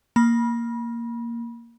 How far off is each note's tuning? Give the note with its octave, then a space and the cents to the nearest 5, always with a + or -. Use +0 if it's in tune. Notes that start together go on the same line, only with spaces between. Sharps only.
A#3 +0 B5 -30